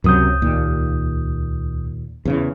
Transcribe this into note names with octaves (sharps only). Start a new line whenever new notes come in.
C#2 F#2 C3 F#3 D#6 G6
D#2 A#2
E2 C#3 E3